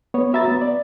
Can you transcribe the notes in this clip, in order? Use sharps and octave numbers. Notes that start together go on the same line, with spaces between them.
B3 C#5
F#4 E5 A#5 B5 A6
B3
D5